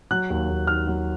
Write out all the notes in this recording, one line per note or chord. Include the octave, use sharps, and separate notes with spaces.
F#3 F#6
D#2
D#2
D#3 F6
F#3